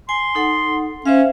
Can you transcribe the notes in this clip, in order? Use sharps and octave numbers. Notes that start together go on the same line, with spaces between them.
G#5 C6
D#4 A4 F#5
C#4 C5 E5 F5